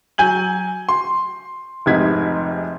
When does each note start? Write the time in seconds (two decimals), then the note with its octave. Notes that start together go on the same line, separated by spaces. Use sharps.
0.18 F#3 G#5 G6 F#7
0.89 C6
1.86 F1 G#2 C3 D#4 G#6 B6